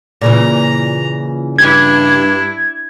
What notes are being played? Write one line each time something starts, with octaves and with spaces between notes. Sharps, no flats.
A#2 C#3 E3 A#5
G2 D4 E4 G#6